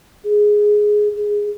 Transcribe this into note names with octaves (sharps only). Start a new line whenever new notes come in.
G#4
G#4